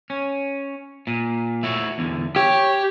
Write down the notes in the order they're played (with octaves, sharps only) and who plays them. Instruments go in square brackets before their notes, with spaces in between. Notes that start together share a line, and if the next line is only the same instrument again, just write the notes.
[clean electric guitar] C#4
A#2
A3 E4 F#4
E2 D3
[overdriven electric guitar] G4 [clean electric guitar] C#5